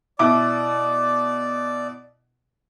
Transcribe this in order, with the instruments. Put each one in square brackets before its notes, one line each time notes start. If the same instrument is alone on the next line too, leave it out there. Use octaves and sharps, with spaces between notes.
[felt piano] B2 E4 D6 [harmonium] D5